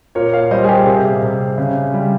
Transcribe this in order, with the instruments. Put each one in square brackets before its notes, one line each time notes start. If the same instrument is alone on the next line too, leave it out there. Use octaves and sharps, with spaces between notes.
[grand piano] A#2 A#4 C#5
C#5 F5
G3 C5 D#5
G#4
G4 A#4
C3 G#4
C3
C#3
G3